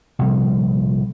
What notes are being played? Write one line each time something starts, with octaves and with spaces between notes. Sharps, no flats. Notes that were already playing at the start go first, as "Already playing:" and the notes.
A#1 C3 F3 G3